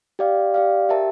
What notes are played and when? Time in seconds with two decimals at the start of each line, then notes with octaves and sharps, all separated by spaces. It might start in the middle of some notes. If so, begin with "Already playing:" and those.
0.19 G4 D5 F5
0.54 G4 D5 F5
0.89 G4 A#4 E5 A5